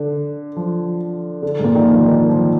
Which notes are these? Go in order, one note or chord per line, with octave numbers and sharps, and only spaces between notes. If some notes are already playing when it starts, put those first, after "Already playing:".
Already playing: D3
F3
D3
G#2
A#2
D#3
F3
D#3
F3